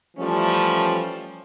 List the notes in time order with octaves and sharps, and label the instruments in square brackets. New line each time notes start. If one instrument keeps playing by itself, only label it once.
[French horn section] E3 F3 G3 A3 C#4